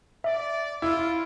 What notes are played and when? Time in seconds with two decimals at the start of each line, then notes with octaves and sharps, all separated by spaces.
0.24 D5 E5
0.82 E4 F4